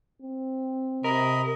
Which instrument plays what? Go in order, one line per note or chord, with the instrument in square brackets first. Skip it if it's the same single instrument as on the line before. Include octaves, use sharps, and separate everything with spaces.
[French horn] C4
[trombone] C3 [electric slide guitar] A#4 [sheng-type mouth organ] D#5 B5